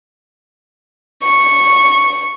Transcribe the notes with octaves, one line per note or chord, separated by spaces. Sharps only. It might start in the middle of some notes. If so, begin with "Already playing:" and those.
C#6